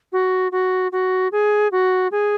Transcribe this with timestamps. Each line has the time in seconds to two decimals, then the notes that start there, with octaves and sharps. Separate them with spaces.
0.12 F#4
0.52 F#4
0.92 F#4
1.32 G#4
1.72 F#4
2.12 G#4